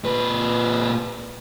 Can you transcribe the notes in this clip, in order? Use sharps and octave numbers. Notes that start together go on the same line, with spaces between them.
A#2 B4